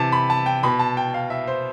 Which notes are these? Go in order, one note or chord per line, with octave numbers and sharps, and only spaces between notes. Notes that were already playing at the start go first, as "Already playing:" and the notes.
Already playing: C3 E3 A5
B5
A5
G5
B2 B5
A5
G5
F5
E5
C5